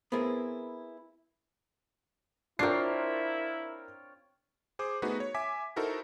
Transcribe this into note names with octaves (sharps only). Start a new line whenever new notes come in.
B3 C4 E4 G#4 A#4
C4 D4 E4 F4 A#4 C#5 G5 C7
G#4 C5 D6
A3 B3 D#4 F#4 G#4 B4
C#5
E5 G#5 D6 B6
D#4 E4 F#4 A4 A#4 C5